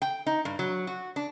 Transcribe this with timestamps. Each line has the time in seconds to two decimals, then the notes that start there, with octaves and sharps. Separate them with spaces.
0.02 G5
0.26 D#4
0.45 G2
0.59 F#3
0.87 F#4
1.16 D4